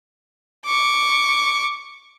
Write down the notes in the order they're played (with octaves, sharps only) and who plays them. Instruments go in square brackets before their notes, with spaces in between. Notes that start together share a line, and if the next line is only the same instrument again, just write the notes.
[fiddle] C#6 D6